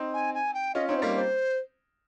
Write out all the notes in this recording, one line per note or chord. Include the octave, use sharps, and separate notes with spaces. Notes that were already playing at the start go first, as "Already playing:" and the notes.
Already playing: C4 D#4
G#5
G#5
G5
C#4 F4 D#5
C4 D#4 C#5
C5
G3 A#3 A#4
C5